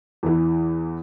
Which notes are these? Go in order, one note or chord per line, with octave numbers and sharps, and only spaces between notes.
E2 E3